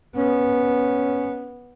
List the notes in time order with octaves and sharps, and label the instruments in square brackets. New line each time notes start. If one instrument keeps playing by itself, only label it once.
[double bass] B3 [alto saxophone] C#4